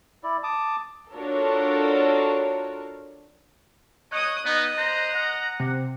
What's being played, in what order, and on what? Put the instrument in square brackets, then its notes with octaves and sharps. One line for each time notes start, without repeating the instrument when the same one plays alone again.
[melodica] E4 D5
A5 D6 D#6
[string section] D4 F4 F#4 A4 A#4 C#5
[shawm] C#5 [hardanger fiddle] D#5 D#6 [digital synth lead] F#6
[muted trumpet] B3 [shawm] D#4 [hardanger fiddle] D#5
[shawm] C5 [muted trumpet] A#5
[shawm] F#5
[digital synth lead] C3